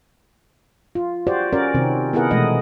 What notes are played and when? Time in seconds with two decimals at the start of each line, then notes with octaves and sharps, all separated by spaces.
0.95 F4
1.27 F#4 G4 C5 D5
1.53 C#4 F#4 A#4 D5
1.75 C3 D#3 C4
2.13 B3 E4 G#4 A#4 F#5
2.31 B2 E3 G#3 A3 D#5